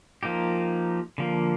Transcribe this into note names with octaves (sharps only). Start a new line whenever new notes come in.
F3 A#3 D#4 G4
D3 F3 A#3